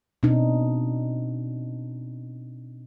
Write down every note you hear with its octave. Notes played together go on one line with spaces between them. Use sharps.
B2 C4 D4 D#4